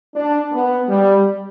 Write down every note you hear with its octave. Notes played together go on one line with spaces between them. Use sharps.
D4
B3
G3